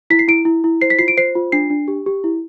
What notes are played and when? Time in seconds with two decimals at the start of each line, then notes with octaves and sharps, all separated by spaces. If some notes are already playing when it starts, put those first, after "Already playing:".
0.10 E4 B6
0.19 C7
0.28 E4 D7
0.45 E4
0.64 E4
0.81 C5 C7
0.90 B6
0.99 F4 C7
1.08 D7
1.17 C5 C7
1.35 F4
1.52 D4 C7
1.70 D4
1.88 G4
2.06 G4
2.24 E4